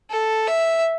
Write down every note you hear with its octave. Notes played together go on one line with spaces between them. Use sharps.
A4
E5